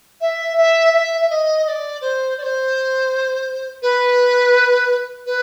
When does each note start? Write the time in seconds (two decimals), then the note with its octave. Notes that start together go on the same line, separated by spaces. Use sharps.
0.21 E5
0.57 E5
0.93 E5
1.21 E5
1.30 D#5
1.64 D#5
1.68 D5
2.01 C5
2.38 D5
2.43 C5
3.82 B4
5.26 B4